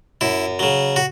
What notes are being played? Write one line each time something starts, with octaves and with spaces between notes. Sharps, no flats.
F#2 E4
C#3 F#3
F#4